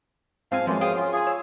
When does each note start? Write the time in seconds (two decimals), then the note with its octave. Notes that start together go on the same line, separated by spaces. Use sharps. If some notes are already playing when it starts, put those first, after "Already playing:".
0.52 G#2 F3 C4 F5 G#5
0.67 F#2 E3 F3 G#3 F4
0.81 G#4 C5 F5 G5 D#6
0.97 C#4 F4
1.13 F4 G#4 G#5 C#6
1.27 C#5 E6